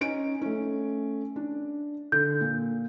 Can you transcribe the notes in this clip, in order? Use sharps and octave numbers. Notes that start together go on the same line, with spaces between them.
C#4 D#4 D7
A3 C#4
D4
D3 G6
A#2